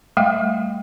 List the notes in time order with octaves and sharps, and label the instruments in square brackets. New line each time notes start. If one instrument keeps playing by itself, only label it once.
[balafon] G3 A3 E5 F5 G5